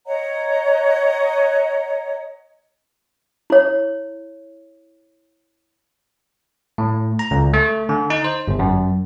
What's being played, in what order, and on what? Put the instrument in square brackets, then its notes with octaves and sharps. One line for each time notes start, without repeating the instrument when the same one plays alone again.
[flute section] C#5 D#5 F#5 A#5
[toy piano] E4 C#5
[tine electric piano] A2
A#5
C#2
A3
D3
D#4
C5
G1
F#2